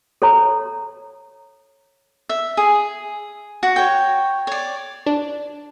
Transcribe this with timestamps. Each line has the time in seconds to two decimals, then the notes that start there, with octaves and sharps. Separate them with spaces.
0.22 A4 C#5 A#5
2.29 E5
2.57 G#4
3.63 F#4
3.76 C#5 G5
4.47 C#5 D5
5.06 D4